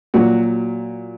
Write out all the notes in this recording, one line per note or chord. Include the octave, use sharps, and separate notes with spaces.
A#2 F#3 F#4